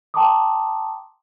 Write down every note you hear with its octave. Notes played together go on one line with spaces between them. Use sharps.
G5 A5 A#5 C6 D6 D#6